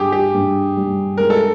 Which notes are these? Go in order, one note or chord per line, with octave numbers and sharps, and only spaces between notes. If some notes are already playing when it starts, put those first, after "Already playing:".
Already playing: G2 D3 G4 G#4
G4
G2
G3
G#3 A#4
A4